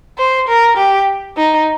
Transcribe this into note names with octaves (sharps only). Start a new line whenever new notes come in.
C5
A#4
G4
D#4